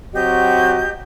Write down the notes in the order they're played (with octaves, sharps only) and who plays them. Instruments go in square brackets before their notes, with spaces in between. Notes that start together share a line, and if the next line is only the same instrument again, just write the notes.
[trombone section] F#3 C4 F#4 [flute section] G4 D#5 G6